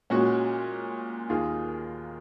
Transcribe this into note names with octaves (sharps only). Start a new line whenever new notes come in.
A#2 G#3 C#4 F#4
D#2 D#3 A#3 F4 G#4